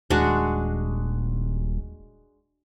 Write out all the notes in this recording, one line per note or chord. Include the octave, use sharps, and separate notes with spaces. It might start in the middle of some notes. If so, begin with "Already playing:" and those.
D#1 G#3 D4 F#4